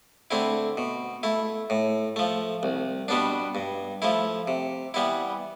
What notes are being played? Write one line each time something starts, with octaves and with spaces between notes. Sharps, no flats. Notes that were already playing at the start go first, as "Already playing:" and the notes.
D3 A3 C4 E4
B2
A3 E4
A2
F3 A3
C2
B2 G3 B3 D4
G2
F3 A3 E4
C3
E3 G3 B3 E4